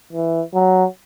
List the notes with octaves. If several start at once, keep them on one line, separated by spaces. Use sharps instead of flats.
E3
F#3